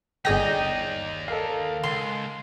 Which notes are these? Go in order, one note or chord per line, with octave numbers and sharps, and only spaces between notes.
G1 D#2 D#4 G#4 D5 D#5 G5 A#6
A4 A#4 F5
C#2 C6